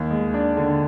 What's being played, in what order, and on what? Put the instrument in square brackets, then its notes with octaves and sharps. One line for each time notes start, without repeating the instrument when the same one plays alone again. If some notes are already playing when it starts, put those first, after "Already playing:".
Already playing: [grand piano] D#2
G#3
D4
D3